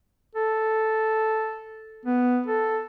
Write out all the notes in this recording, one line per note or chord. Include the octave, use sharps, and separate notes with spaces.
A4
B3
A4